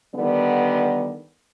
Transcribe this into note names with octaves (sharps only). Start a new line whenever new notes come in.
D3 D#3 G3 B3